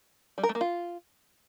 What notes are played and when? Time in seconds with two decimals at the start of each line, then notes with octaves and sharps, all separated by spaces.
0.38 G3
0.43 A#4
0.49 A3
0.55 A#3
0.61 F4